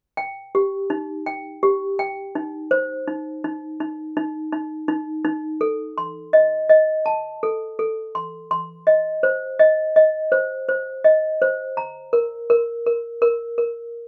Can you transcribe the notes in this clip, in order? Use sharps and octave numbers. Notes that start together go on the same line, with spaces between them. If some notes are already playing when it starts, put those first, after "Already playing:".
G5
G4
D#4
G5
G4
G5
D#4
C5
D#4
D#4
D#4
D#4
D#4
D#4
D#4
A4
C6
D#5
D#5
A5
A4
A4
C6
C6
D#5
C5
D#5
D#5
C5
C5
D#5
C5
A#5
A#4
A#4
A#4
A#4
A#4